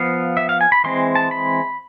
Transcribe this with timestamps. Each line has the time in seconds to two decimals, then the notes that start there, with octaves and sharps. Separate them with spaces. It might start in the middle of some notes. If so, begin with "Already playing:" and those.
Already playing: F3 B3 F5
0.37 E5
0.49 F5
0.61 G#5
0.72 B5
0.84 E3 G#3 C4 C6
1.15 A5
1.31 B5